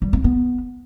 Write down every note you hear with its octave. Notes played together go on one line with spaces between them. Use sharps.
G3
C4
B3